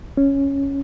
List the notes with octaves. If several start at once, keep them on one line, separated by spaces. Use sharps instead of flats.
C#4